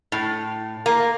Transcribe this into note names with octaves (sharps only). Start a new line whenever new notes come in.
A2
A#3